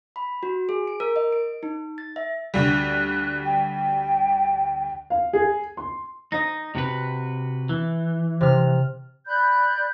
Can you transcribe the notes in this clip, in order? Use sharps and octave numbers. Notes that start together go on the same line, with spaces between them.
B5
F#4
G#4
D7
A#4
D#5
D7
D#4
A6
E5
D2 G3 F#6
G5
F5
G#4
C6
D#4 D#5 A#6
C3 F#4 B4
E3
C3 F6
D5 B5 F#6 G6